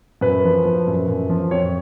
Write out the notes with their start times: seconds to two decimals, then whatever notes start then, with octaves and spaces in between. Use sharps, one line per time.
0.21 F#2 B4
0.44 F3
0.65 F3
0.87 F#2
1.08 F#2
1.30 F3
1.51 F2 C#5